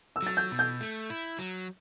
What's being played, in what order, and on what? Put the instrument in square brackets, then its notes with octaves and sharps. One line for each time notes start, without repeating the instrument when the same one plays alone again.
[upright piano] E6
[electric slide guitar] F#3 [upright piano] A6
[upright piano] G6
[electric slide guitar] B2
[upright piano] G6
[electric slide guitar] A3
E4
F#3